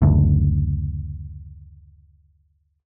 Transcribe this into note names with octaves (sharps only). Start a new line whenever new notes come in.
F#1 D2